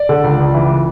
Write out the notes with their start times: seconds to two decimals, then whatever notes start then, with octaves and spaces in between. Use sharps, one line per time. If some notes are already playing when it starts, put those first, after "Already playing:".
Already playing: D5
0.09 D3
0.24 C#2
0.40 C#2
0.54 E3